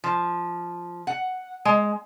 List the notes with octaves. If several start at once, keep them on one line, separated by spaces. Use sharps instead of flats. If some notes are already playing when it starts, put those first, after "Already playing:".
F3
F#5
G#3